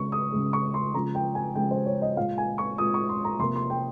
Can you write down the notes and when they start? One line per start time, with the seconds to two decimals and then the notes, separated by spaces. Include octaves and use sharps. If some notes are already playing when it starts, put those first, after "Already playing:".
Already playing: C#3 G#3 C#6
0.12 D#6
0.32 C#3 G#3
0.53 C#6
0.74 C6
0.94 C#3 F3 G#3 A#5
1.15 G5
1.35 G#5
1.55 C#3 F3 G#3 G5
1.71 C5
1.86 C#5
2.02 D#5
2.17 A#2 G#3 F5
2.38 G#5
2.58 C#6
2.78 A#2 G#3 D#6
2.94 C#6
3.09 C6
3.24 A#5
3.39 C3 F3 A#3 C6
3.55 C6
3.70 G5